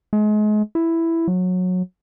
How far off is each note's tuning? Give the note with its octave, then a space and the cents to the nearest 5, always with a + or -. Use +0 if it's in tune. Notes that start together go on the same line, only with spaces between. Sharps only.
G#3 +35
E4 +5
F#3 -20